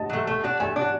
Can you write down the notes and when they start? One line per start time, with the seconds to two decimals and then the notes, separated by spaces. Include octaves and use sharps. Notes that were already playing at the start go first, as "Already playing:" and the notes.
Already playing: D#5 F#5 A5
0.10 F#3 A3
0.27 A3
0.44 D4 F#4
0.60 A3 G#5
0.76 D4
0.81 F#4